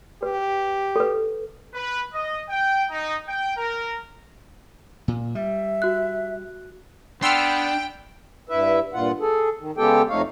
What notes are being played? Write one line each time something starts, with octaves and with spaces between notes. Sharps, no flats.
G4 B4
A4 B4
B4
D#5
G5
D#4
G5
A#4
A#2
G3 E5
F#4 F#6
B3 D4 G5 C6 E6 F6
G2 E4 B4 E5
G2 A#2 F4 F#5
G#4 A4
D#3
C#3 G#3 B3 G4 A4 G5
F2 A3 D#4 C#5 F5